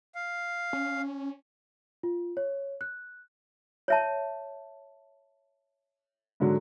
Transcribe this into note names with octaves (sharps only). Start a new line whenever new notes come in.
F5
C#4
F4
C#5
F#6
C#5 E5 A5
G#2 D3 F#3